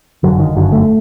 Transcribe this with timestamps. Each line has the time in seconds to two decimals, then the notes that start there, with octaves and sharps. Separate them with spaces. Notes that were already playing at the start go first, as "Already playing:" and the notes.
0.23 G1 F#2 D3 F#3
0.40 D#3
0.56 G1 F#2 D3 F#3
0.72 A3